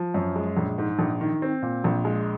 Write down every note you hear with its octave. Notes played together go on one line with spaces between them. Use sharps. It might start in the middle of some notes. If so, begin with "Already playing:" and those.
Already playing: F3
F#2
G#3
A#1
G#2
A#1
D#3
C4
A#2
A#1
G#3